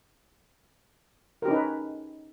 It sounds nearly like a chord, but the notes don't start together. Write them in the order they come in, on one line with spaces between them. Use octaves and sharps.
A#4 G4 C#4 D#4 B4